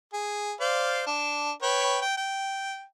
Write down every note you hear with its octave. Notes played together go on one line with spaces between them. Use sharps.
G#4
C5 D5 F5
D4
B4 C#5 G5
G5
G5